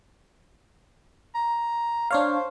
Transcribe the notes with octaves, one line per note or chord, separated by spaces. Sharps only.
A#5
D4 C5 C#5 F5